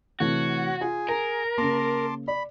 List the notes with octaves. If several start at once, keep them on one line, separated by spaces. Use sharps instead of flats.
C3 E3 A3 F#4 C#5 F#6
F4 G#4
A#4 A#5
C#3 A#3 A5 C6 D6
D5 B5